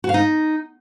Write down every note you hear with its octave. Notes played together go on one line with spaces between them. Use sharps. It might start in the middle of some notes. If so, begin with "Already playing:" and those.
F#4
F5
D#4